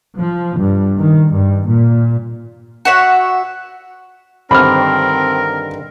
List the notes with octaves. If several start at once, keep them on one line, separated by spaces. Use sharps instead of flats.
F3
G2
D#3
G2
A#2
F#4 C#5 E5 F#5
G2 D3 D#3 C4 A#4 B5 F6